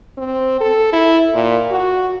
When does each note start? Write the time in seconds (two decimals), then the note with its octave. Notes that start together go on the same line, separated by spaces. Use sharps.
0.18 C4
0.61 A4
0.93 E4
1.34 A#2
1.71 F#4